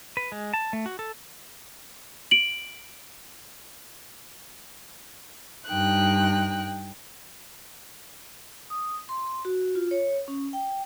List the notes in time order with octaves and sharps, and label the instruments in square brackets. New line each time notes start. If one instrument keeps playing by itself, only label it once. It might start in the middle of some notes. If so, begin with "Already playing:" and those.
[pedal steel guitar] B4
G#3
A5
A3
F#4
A4
[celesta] D7 F#7
[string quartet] G2 D#4 G5 F#6
[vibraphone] D#6
C6
F#4
F4
C#5
C#4
G5